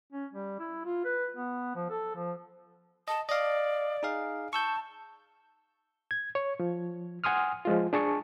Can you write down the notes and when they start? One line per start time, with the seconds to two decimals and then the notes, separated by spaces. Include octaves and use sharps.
0.13 C#4
0.33 G3
0.60 E4
0.85 F4
1.05 B4
1.36 B3
1.75 F3
1.90 A4
2.15 F3
3.08 D#5 A5
3.29 D5 D#5 F5
4.03 D#4 G#4 F5
4.53 A5 C#6 E6 G6
6.11 G#6
6.35 C#5
6.60 F3
7.24 F#5 G#5 C6 D#6 F6
7.65 F3 G#3 F4
7.93 D4 G#4 A5 C#6